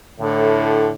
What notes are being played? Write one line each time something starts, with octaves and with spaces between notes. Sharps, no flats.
A2 D3